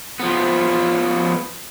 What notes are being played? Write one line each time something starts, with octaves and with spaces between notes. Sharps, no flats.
F3 B3